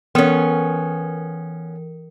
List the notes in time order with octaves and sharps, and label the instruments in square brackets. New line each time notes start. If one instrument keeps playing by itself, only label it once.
[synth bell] E3 A#4 [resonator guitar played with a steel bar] B3 C#4